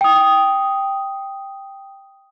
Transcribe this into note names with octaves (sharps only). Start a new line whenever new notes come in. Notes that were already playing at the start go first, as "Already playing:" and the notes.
G5 D#6